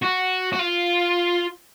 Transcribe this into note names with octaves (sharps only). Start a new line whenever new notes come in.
F#4
F#4
F4